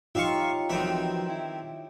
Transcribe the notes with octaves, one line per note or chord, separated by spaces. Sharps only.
D#4 F4 G4 C#5 E5 F5 G5 C#6
F2 D#3 E3 F#3 C4 E5
E4